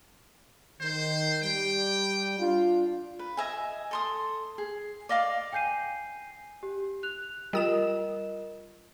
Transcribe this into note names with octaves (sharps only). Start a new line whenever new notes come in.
D#3 C5
G3 G5
D4 F4
B4
D#5 E5 G#5
A4 C6 D#6
G#4
D5 D#5 F5 D6
G5 G#5 G6 C7 D#7
G4
F#6 F7
G3 F4 A#4 D#5 D#6 E7